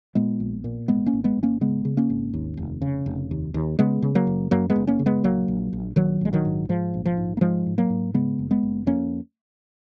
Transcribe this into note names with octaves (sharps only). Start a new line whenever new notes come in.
A#2 G#3 B3
A#1
A#2
G#1 G#3 B3
A#3 C#4
G#1
G#3 B3
G#1
A#3 C#4
C#3 G#3 B3
C#3
A#3 C#4
G#1
D#2
F1
C#3
F1
D#2
D#2
C#3 G#3 B3
C#3
F#3 A#3
F#1
F#2 F#3 A#3
G#3 B3
F#1
A#3 C#4
C#3
G#3 B3
A#1 F#3 A#3
A#1
A#1
A#1 D#3 F#3
A#1 G#3
D#3 F#3
G#2
G#2 F3
A#1
F3
G#2
A#3
G#2 F3 G#3
G#2
F#3 A#3
G#2
C#3 G#3 B3
F#1
G#3 B3
F#1
F2 A#3 C#4